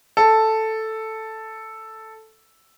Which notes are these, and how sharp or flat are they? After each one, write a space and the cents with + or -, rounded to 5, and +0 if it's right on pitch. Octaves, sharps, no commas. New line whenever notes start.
A4 +0